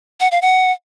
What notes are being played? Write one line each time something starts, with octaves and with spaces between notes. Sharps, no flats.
F#5
F5
F#5